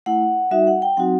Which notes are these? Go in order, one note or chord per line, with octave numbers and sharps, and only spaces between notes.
A3 E4 F#5
G3 D#4 F#4 E5
F#5
G5
F#3 C4 D#4 F#4 F#5